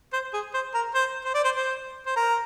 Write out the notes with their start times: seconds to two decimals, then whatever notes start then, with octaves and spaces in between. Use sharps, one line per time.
0.13 C5
0.33 G#4
0.54 C5
0.74 A#4
0.95 C5
1.24 C5
1.34 D5
1.44 C5
1.56 C5
2.06 C5
2.16 A#4